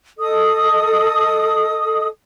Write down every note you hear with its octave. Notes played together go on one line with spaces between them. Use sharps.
A4 D#5 D#6